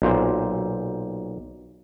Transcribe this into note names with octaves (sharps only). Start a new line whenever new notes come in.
B1 A#2 C5